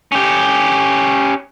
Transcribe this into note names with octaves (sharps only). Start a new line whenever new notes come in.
C#4 G4